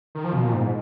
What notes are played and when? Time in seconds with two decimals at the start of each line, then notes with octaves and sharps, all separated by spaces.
0.15 D#3
0.24 F3
0.33 B2
0.43 A#2
0.54 G#2